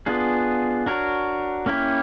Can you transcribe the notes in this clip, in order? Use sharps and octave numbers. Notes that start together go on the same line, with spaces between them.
B3 D4 F4 G#4
D4 F#4 A#4 C#5
A#3 C#4 E4 G4